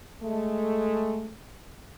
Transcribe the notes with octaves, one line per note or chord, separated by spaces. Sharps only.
G#3 A3